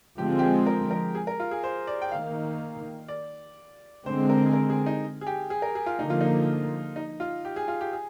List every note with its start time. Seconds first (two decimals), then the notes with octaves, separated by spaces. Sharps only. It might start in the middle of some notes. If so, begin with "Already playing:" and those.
0.18 D3 F3 G#3 C4 G4
0.39 G4
0.43 G#4
0.66 A#4
0.91 A#4
1.15 G#4
1.27 A#4
1.40 F4
1.51 G#4
1.64 C5
1.87 D5
2.02 G5
2.12 D#3 A#3 F5
3.08 D5
4.05 D3 G#3 C4 C5
4.29 A#4
4.46 G#4
4.53 A#4
4.70 G#4
4.86 D#4
5.21 G#4
5.27 G4
5.50 G#4
5.62 A#4
5.75 G#4
5.86 F4
5.99 D3 F3 A#3 D#4
6.10 F4
6.21 D#4
6.96 D#4
7.20 F4
7.45 G4
7.56 G#4
7.68 F4
7.81 G4
7.93 G#4